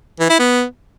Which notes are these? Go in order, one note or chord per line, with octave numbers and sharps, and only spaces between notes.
E3
E4
B3